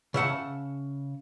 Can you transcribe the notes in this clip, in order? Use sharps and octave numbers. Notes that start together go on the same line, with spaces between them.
C#3 E5 F#5 A5